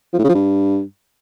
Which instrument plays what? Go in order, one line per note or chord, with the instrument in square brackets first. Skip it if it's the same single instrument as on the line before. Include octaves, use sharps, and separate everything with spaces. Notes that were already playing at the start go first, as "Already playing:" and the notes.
[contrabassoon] F3
A2
C#3
F3
G2